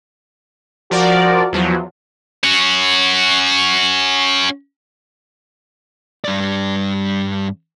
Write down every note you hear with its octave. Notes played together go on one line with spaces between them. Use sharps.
F3 F#4 A#4 D5
E2 F3 F#3
C#4 F#4
G2 D5